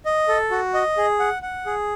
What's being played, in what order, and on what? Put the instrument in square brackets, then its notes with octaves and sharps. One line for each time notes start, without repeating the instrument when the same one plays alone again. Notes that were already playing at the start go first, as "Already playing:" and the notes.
[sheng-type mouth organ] D#5
A4
F#4
D#5
G#4
F#5
F#5
G#4